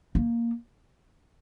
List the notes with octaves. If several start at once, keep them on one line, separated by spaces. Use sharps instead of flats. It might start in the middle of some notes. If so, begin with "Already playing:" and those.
A#3